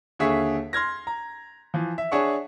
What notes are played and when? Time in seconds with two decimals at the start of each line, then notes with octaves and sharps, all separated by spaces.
0.19 D#2 D3 G#4 E5 C#6 B6
0.73 C6 F6 G#6 A#6
1.07 A#5
1.74 E3 F3
1.98 E5
2.12 D4 G#4 C#5 E5 F#5 C#6